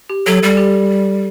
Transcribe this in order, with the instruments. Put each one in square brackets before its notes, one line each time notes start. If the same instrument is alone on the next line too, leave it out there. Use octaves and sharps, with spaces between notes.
[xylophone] G4
[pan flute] F#3 [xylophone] A4
[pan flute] G3 [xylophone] A4
[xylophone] G4